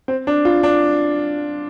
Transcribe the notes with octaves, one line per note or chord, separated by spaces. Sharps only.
C4
D4
F4
D4